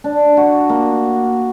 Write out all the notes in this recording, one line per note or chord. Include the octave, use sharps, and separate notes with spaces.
D4
F#4
A#3